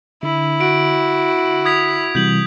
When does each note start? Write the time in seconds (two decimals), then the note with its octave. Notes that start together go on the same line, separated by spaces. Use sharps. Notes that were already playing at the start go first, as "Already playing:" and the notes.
0.23 D3 E4
0.61 F#4 D7
1.65 D#6 G#6 B6
2.15 C3 E3 G3 G6 B6 F#7